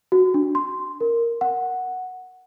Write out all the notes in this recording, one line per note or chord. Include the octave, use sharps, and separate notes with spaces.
F#4
D4
C6
A#4
F#5